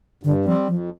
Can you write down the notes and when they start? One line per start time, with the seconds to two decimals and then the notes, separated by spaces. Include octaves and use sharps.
0.23 G2 D3
0.45 F3 G3 C4
0.68 F2 F3